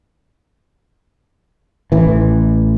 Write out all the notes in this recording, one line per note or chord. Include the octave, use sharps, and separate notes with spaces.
A1 E3